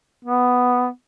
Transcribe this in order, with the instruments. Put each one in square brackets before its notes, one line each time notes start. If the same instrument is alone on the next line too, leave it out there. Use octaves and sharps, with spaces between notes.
[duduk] B3